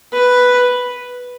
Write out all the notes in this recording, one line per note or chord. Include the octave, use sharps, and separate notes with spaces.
B4